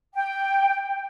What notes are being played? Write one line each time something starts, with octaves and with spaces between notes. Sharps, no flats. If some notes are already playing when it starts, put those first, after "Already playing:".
G5